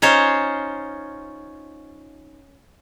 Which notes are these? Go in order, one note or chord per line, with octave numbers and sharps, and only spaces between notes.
C#4 D#4 F4 C5 C#5